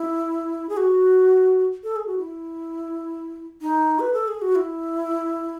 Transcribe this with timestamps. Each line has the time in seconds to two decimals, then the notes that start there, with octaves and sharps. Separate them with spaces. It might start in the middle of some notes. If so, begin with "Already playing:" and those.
Already playing: E4
0.69 G#4
0.77 F#4
1.83 A4
1.96 G#4
2.07 F#4
2.18 E4
3.61 D#4
3.99 B4
4.13 A4
4.28 G#4
4.41 F#4
4.55 E4